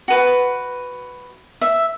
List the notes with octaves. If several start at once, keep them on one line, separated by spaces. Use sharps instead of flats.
F#4 B4
E5